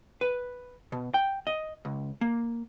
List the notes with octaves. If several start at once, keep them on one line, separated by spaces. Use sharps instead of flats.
B4
B2
G5
D#5
C#2
A#3